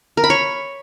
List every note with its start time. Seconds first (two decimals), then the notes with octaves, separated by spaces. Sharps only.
0.17 A#4
0.24 B5
0.30 C#5